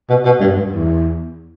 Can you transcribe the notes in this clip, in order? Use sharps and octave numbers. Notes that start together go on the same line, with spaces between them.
B2
B2
G2
G2
E2